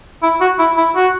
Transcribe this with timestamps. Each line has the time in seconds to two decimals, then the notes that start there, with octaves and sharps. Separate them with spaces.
0.23 E4
0.41 F#4
0.59 E4
0.77 E4
0.96 F#4